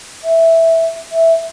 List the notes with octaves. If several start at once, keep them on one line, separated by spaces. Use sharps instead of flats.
E5
E5